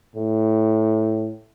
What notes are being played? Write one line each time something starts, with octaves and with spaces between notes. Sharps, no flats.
A2